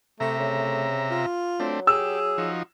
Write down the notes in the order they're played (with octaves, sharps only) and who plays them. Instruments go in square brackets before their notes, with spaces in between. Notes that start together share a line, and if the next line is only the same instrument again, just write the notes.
[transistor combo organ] C3 E5 A#5 [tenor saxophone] A3
[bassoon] C#3 [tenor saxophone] A3
[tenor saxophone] F4
[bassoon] F#3 [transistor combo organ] A3 C4 D4
[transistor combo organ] G4 [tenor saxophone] G#4 [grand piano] E6
[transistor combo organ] F3 D#4 F#4